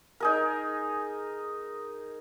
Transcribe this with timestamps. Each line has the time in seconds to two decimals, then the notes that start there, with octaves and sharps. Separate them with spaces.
0.20 D#4 G#4 A#4